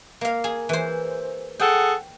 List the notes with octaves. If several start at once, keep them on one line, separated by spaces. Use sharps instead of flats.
A#3 F5
G#4
E3 C5
G#4 A4 F#5 G5